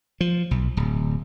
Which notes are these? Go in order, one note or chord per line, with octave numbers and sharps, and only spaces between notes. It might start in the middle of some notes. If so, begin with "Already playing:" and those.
F3
B1
D1